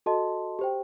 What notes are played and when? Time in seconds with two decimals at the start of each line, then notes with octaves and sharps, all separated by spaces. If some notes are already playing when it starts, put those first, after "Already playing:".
0.06 F#4 A4 D#5 A5 C6
0.59 G4 C5 G5